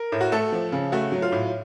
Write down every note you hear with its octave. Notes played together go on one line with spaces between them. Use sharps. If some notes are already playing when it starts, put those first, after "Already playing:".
Already playing: A#4
A2
F#4
A3 A4
F3
C#3
A3 F#4
F#3
F4
A2